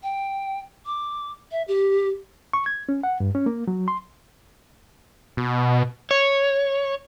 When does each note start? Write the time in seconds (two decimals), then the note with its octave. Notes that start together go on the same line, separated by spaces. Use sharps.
0.03 G5
0.86 D6
1.52 E5
1.68 G4
2.53 C#6
2.66 G#6
2.89 C#4
3.03 F#5
3.20 G2
3.35 C#4
3.46 A#3
3.68 F#3
3.88 C6
5.37 B2
6.11 C#5